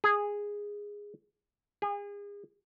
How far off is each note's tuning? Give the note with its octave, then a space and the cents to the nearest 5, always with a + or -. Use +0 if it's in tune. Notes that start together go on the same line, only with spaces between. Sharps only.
G#4 -10
G#4 -35